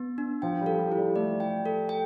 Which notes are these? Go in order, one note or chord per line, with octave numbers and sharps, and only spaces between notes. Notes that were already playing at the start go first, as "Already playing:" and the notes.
Already playing: B3
D4
F3 G5
G3
A4
G3
E4
G3
A3 D5
G5
A4
G5